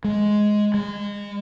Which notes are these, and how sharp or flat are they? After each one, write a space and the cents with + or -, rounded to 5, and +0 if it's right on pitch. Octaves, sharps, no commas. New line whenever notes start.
G#3 +10
G#3 -30